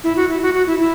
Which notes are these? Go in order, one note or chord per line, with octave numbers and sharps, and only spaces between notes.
E4
F#4
E4
F#4
F#4
E4
E4